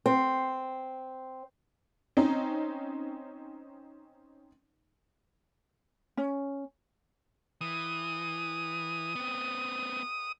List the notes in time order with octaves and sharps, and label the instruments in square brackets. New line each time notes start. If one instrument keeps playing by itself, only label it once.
[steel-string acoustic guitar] C4
[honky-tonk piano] C4 C#4 D#4
[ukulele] C#4
[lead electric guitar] E3 [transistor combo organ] D#6
[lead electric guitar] B3 C4